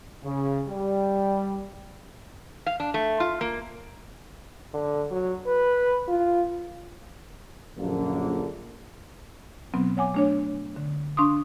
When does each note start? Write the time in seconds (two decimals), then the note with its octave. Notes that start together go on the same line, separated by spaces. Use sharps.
0.24 C#3
0.69 G3
2.66 F5
2.80 D4
2.94 A3
3.20 F4
3.41 A#3
4.73 D3
5.11 F#3
5.47 B4
6.08 F4
7.77 A#1 F#2 D3 A#3
9.74 B2 F#3 B3 C4
9.97 C#5 F#5 G#5 D6
10.14 A3 D4 C#5
10.76 D3
11.17 D4 F5 C6 C#6 D#6